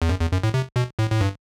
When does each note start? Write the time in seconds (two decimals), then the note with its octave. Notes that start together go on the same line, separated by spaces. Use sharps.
0.02 E2
0.09 F#2
0.21 E2
0.32 F#2
0.43 A2
0.54 C3
0.76 B2
0.99 A2
1.11 A2
1.21 G2